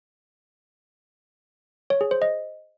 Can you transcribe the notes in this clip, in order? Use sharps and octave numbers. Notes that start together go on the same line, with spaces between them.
C#5
G#4
C5
D#5